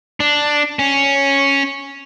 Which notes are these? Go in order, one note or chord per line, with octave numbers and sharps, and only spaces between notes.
D4
C#4